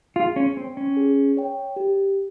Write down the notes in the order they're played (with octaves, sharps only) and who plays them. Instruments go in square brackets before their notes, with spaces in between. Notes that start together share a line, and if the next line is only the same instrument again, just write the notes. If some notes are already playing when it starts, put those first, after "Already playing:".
[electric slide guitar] F4 [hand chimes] G#4
[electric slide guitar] C#4
[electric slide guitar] C4 [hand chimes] C#5 G5
[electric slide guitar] C#4
[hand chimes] G#4
C#5 G5
G4